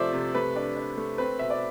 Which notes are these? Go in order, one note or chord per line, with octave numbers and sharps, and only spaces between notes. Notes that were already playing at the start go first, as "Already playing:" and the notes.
Already playing: C3 F3 A3 C5 D5 E5
C3
A3 B4
D4
D4
A3
C4 B4
B2 E5
D5